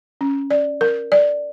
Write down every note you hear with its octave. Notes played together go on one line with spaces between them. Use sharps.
C#4
D5
A#4
D5